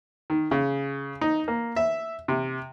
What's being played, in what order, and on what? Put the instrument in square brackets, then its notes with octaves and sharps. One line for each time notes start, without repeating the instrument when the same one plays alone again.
[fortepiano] D#3
C#3
D#4
A#3
E5
C3